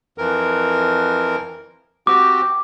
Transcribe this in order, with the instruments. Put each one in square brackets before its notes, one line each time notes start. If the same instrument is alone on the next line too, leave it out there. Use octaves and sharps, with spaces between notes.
[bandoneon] F2 E3 A#4
[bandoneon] C4 F#4 G4 [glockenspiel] D6